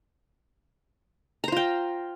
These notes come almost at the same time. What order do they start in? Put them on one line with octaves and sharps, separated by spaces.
A#5 C5 F4 G5